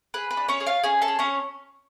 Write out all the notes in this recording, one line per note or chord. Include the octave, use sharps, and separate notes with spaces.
G#4 B4
B4
D4
C#4 C#5
G#4
F4 F5
C#4 G#4 G#5
A4 A5
G#4
C#4 C#5